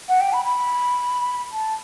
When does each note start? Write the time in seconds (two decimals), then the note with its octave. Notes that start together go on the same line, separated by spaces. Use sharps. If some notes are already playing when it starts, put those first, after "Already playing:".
0.09 F#5
0.21 G5
0.33 B5
0.45 B5
1.52 A5